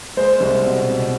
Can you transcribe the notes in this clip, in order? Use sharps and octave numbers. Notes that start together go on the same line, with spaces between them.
G#3 C5
C2
B2
B2